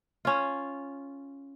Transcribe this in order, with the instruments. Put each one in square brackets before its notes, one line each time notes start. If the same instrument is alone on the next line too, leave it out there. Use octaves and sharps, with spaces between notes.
[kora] C#4 F4